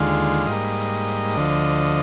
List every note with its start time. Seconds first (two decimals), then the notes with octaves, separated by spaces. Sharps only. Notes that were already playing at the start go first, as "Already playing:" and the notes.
Already playing: D#2 D3 G#3 F4
0.47 G#2 G3 A#3 D#5
1.37 D2 D3 F3